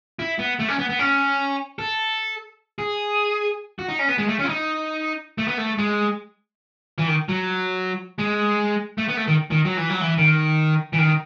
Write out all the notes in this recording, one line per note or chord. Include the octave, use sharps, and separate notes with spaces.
E4
B3
A3
C#4
B3
B3
C#4
A4
G#4
F#4
D#4
C#4
B3
G#3
A3
C#4
E4
D#4
A3
B3
A3
G#3
E3
D#3
F#3
G#3
A3
B3
A3
D#3
D#3
F#3
E3
F#3
E3
D#3
E3
D#3